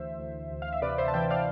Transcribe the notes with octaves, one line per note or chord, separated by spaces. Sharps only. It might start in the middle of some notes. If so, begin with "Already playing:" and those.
Already playing: D2 E3 C5 E5
D2
D2
F5
E5
C3 B4 D5
C5 E5
A5
E3 E5 G5
D5 F5